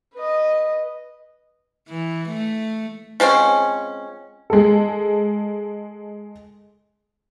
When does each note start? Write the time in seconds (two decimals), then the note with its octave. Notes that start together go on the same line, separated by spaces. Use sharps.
0.14 B4 D#5
1.89 E3
2.28 A3
3.20 F3 G#3 C4 C#4
4.50 G#3 A4